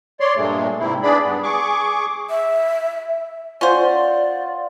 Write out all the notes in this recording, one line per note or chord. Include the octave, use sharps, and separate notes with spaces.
C#5 D5 C6
G2 A#2 G#3 A3
G#2 C3 C4 E4
B3 D4 G#4 D5 B5
G2 B3
G#4 C#6 D6
E5
C#4 F4 C5 D5 F#5 C#6